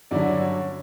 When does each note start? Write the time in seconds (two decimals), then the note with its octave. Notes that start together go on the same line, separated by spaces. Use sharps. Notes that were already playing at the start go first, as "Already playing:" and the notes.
0.11 G2 D3 F#3 C#4 E4 D5
0.40 C#5